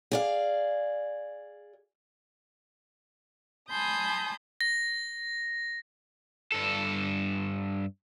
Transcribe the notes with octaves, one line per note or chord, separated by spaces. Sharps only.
G#4 D5 F5
G#5 A5 B5 C6 D#6 G6
A#6
G2 A4